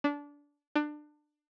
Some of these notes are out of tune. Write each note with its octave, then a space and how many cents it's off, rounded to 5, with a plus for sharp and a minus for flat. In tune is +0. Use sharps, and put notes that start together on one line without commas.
D4 -20
D4 +25